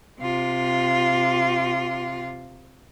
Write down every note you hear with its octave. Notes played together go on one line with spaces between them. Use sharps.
C3 F4